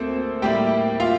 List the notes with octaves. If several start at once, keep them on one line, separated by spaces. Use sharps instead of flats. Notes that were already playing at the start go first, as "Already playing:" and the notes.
Already playing: D2 A#3 C4 A4 C5
A2 G3 A#3 E4 G4 G5
F4 F5